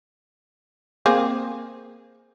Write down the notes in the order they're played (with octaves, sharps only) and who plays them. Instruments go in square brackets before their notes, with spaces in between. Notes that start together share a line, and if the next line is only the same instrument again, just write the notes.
[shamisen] A#3 C4 G#4